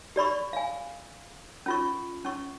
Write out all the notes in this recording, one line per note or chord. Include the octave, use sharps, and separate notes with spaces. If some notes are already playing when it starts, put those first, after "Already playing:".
G4 D5 B5 C#6
F5 G#5
C#4 F4 C#6
C#4 C#6